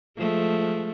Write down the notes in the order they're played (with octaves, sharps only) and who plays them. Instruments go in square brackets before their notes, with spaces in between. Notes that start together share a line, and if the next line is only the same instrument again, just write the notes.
[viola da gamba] F3 G#3 A3